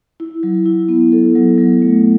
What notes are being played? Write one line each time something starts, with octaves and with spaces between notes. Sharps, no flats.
E4
F#3
E4
B3
A4
F#3
F#3
A3